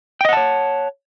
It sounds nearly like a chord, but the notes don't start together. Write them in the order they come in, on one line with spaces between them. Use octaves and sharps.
G5 D#5 F#5 A5 C#5